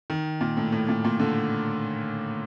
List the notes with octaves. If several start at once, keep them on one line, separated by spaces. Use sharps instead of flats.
D#3
A#2
A2
A2
A#2
A#2
D3